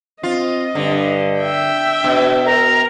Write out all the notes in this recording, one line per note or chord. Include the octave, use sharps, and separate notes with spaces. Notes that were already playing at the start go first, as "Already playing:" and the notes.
C4 F4 D#5
G2 D3
E5 G5
B2 D4
A#4